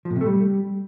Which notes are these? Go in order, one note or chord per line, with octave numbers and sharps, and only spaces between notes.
F3
A2
C3
A3
G3